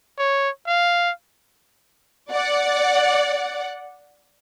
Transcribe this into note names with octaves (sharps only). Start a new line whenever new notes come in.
C#5
F5
D5 F#5